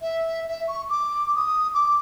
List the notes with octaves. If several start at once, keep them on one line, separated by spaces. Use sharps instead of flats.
E5
E5
C#6
D6
D#6
D6